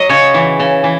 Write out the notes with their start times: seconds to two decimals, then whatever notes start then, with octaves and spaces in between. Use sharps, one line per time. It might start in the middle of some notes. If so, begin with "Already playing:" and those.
Already playing: F#3 D#5
0.09 C#3 C#5
0.34 E3
0.59 C#3
0.83 E3